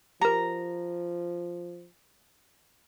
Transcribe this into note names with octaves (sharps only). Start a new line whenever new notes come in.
F3 G4 A#4 A#5